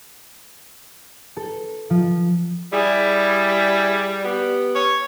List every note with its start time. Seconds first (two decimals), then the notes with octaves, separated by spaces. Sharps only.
1.37 A4
1.90 F3
2.73 G3 E4 G#4
4.25 B3 G4
4.75 C#5